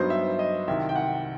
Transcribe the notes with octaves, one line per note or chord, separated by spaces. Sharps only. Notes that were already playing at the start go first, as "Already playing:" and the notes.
Already playing: G2 F#3 B3 D#4 C5
E5
D#5
C2 C3 D#3 E5
G5
F#5